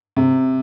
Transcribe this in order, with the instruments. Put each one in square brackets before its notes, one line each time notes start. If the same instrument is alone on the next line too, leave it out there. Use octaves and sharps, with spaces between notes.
[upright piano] C3